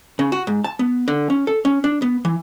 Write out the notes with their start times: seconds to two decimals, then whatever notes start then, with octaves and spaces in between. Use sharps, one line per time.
0.19 C#3
0.32 F#4
0.47 G#2
0.64 A5
0.79 B3
1.08 D3
1.30 C#4
1.47 A4
1.65 C#4
1.84 D4
2.02 B3
2.25 E3